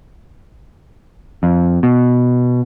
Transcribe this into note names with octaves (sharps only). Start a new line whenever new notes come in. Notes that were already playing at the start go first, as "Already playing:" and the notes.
F2
B2